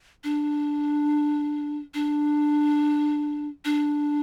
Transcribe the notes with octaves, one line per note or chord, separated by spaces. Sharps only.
D4
D4
D4